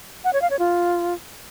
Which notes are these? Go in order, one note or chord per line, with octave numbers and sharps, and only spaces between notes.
F#5
C#5
F5
C#5
F4